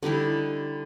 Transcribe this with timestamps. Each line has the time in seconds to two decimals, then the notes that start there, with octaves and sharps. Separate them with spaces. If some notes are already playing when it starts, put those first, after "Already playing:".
0.03 D3 G3 D#4 E4